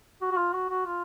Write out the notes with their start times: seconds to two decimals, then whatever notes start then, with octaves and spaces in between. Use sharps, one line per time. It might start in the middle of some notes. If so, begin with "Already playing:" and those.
0.21 F#4
0.31 F#4
0.38 F4
0.53 F#4
0.70 F#4
0.86 F4